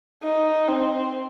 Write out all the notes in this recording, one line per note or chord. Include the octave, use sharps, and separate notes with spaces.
D#4
C4